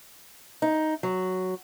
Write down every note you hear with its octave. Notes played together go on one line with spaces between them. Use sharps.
D#4
F#3